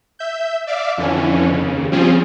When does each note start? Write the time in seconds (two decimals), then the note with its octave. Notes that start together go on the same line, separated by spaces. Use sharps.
0.19 E5 G6
0.67 D5 E5 F5 D6
0.98 F2 D3 E3 C#4
1.52 D#2 C#3
1.92 F3 G3 C4 C#4 F4 G#4